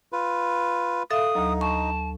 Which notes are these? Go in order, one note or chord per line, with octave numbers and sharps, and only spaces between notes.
F4 B4
A4 E5 F5 D#6
D2 F#3 D#4
A5 C#6